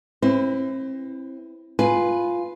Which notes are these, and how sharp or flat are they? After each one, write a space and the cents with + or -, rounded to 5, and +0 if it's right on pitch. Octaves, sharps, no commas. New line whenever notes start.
C4 +30 E4 +0 B4 +40
F4 +0 B4 +0 G#5 +0